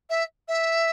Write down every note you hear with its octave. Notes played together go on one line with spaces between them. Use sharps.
E5
E5